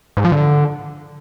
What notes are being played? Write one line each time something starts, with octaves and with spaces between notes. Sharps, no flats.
G#2
F3
D3